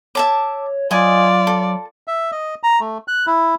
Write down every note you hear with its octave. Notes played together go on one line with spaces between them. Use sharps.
C#5 E5 A5 D6
F#3 F4 D5 D#5 G#5
A4
E5
D#5
A#5
A3
F#6
E4